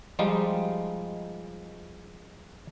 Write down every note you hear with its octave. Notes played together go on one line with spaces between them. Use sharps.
F3 G3 G#3 D#4 F4